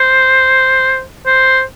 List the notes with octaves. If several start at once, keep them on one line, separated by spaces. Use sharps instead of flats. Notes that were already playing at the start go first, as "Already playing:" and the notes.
Already playing: C5
C5